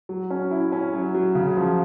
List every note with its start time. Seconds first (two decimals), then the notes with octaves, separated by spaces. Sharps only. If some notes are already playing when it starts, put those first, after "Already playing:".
0.09 F#3
0.30 C#4
0.51 E4
0.72 C#4
0.93 F#3
1.15 F#3
1.35 C#3
1.57 F3